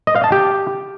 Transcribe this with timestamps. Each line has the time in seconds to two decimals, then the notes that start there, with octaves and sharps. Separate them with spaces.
0.07 D#5
0.16 F5
0.24 A5
0.32 G4